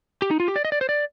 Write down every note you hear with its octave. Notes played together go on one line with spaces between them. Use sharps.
G4
D#4
F4
G4
D5
D#5
D5
C5
D5